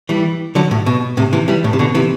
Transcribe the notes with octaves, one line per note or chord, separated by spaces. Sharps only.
E3 G3
D3 F#3
A2
B2
A2 C3
C3 E3
E3 G3
A2
C3
B2 D3
C3 E3